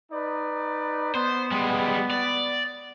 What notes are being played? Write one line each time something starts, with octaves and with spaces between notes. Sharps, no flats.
D#4 B4 D5
B3 C5
G3 G#3
D5